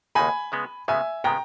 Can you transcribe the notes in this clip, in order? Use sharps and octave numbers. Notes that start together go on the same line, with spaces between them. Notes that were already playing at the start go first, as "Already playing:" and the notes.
D#2 C#3 G#3 D#4 G#5 B5
C#3 G#3 B3
C#3 G#3 B3 E5 G#5
C#3 G#3 B3 G5 A#5